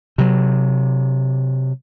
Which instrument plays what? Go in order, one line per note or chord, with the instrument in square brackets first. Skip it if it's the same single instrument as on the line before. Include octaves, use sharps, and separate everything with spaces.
[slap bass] C3 F#3